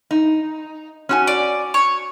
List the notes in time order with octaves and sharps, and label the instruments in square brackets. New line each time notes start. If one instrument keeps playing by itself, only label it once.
[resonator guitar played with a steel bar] D#4
C#4 F#4 G#5
[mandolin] D5
C#5